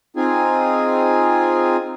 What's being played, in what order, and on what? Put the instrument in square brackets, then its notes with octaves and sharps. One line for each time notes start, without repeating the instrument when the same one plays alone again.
[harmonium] C4 D#4 F4 G#4 G#5